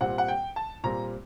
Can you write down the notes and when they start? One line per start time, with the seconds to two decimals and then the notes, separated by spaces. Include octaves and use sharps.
0.01 A#2 G3 C4 F#5
0.18 F#5
0.28 G5
0.56 A5
0.84 A#2 G3 C4 A#5